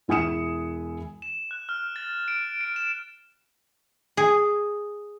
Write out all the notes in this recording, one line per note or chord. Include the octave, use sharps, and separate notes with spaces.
E1 E4 G#5 D#6 C#7 E7
E7
F#6
F6
A6
D7
D7
E7
G#4